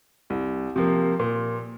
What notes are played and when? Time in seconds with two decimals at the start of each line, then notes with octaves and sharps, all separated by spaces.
0.30 C2
0.76 C3 F3 A#3
1.20 A#2